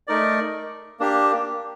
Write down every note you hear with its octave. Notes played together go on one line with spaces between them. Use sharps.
A3 D#4 A#4 D5
A#3 D4 G4